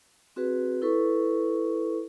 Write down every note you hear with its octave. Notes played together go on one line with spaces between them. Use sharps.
C4 F#4 G#4 B4
E4 A4 B4 C#6